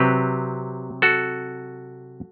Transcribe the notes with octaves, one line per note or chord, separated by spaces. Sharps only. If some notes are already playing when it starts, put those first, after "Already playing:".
Already playing: C3 F#3 C4 G4 B4
F#4 A4